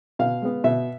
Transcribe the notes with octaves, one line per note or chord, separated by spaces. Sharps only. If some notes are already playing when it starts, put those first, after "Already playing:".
B2 F5
G#3 B3
B2 E5